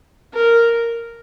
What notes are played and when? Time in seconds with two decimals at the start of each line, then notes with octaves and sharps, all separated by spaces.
0.33 A#4